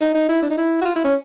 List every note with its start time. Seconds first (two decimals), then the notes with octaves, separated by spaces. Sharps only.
0.01 D#4
0.14 D#4
0.29 E4
0.42 D4
0.50 D#4
0.58 E4
0.82 F#4
0.86 F4
0.96 E4
1.04 C#4